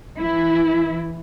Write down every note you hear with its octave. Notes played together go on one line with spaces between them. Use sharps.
E3 E4